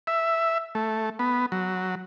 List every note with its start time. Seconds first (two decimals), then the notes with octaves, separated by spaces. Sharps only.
0.07 E5
0.75 A3
1.19 B3
1.52 F#3